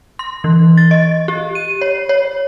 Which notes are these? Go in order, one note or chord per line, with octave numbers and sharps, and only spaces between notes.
C6
E3
A6
D#5
G4
D#7
C#5
C#5